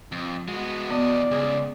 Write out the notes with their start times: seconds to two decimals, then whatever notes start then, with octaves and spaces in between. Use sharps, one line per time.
0.12 F2
0.48 G#3 B3 F#4
0.90 E3 B3 D5 D#5
1.31 C#2 G#4